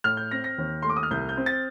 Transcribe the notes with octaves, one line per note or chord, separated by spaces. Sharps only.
A2 F6
G6
C4 A#6
A#6
D#2
A3 C6
D6
D#6
F6
C2 G6
G6
C4
A6